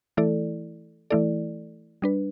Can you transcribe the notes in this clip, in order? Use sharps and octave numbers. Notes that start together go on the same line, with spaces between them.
E3 A3 E4 A4 D5
E3 A3 E4 A4 D5
G3 D4 B4